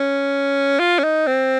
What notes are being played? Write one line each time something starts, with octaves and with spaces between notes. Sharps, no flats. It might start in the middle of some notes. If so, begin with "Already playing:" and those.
Already playing: C#4
F4
C#4
D#4
C4